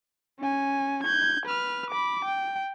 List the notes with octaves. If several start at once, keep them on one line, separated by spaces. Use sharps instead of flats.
C#4 G#5
G6 G#6
B4 F6
B5 D6
G5